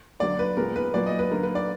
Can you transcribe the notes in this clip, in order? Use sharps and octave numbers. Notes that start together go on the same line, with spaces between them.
D3 F#3 A#3 D5
B4
A#2 G#3 B3 A#4
B4
A#2 F#3 A#3 D5
D#5
B4
D3 F#3 A#3 A#4
B4
D5